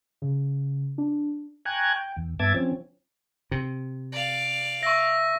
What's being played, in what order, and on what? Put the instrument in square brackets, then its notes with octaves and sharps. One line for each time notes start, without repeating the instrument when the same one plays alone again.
[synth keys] C#3
D4
[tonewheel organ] G5 G#5 A#5 C#6 F#6 G#6
G5
E2
G2 B3 E5 A5 D6 G#6
F3 C4 C#4
[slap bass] C3
[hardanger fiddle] D5 F5
[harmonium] E5 [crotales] C#6 A#6